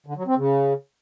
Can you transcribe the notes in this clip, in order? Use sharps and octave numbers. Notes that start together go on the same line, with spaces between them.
D3
F#3
C4
C#3